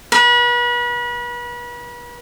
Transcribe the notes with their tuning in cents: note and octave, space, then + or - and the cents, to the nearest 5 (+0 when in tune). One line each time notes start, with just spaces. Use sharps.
B4 -35